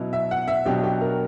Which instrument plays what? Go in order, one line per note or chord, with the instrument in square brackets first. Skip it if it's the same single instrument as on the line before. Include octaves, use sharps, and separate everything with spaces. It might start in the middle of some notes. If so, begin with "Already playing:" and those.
Already playing: [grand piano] B2 F#3 C#4 E4
[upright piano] E5
F#5
E5
[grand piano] B2 F#3 B3 D4 [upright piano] G4
[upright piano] G4
A#4